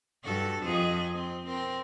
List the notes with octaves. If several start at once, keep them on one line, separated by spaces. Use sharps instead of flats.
G2 F#4 A4
F2 G#4 D#5
C4
C4 A#4